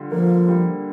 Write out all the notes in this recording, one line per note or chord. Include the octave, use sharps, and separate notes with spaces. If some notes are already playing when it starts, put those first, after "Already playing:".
Already playing: D3 G3 F4
F3 A#3
G3